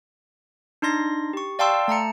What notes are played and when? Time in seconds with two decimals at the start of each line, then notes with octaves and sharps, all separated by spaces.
0.82 D4 D#4 C6 A#6
1.33 G4 C#6
1.59 D5 F5 G5 A5 C6 E6
1.88 A3 A5 A#5 C#7